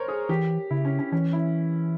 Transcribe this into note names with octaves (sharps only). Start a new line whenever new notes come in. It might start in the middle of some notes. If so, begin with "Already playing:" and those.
Already playing: A#4 C5 C#5
G#4
E3 G4
C#3 E4
C#4
C#4
E3 C#4
E4